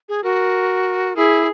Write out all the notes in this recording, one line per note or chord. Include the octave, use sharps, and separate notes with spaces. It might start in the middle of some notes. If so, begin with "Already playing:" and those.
G#4
F#4 A#4
E4 G#4